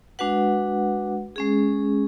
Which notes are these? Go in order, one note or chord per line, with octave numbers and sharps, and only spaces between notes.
G#3 D4 F#4 B4 F#5
G#3 C#4 G#4